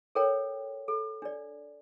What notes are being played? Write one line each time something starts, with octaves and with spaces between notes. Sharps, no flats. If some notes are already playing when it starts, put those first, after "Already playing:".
A4 A#4 C#5 G5
A4
D4 D5